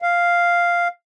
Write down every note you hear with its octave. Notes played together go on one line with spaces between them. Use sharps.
F5